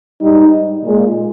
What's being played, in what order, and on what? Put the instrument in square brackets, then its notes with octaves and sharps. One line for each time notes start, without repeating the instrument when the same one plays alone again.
[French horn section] G#2 G3 D#4
A#2 G#3